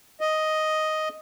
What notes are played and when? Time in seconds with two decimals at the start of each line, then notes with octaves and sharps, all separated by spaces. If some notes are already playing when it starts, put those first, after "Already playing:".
0.21 D#5